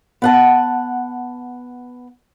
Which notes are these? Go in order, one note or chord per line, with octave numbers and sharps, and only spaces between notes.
B3 F#5 A5